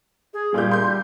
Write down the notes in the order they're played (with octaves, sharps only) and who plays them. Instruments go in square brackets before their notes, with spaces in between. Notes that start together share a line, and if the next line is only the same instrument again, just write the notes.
[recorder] G#4
[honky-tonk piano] A#2 F4 G6 [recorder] G3
[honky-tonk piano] C6 G6